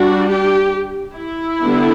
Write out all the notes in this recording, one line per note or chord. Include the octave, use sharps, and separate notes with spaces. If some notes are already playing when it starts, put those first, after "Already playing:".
Already playing: G3 D4 F#4
G4
E4
D3 G3 B3 D4